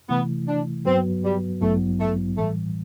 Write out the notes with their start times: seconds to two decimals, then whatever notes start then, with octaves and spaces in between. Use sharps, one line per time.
0.09 C3 E3 A3 B3 E4
0.48 D4
0.85 G2 F#3 B3 C4 F#4 B4
1.24 G3
1.61 A1 G2 F#3 A3 B3 E4
2.00 A3
2.37 A2 E3 G3 A3